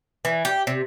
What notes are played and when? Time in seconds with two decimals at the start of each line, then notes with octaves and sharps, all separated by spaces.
0.25 E3
0.45 G4
0.67 C3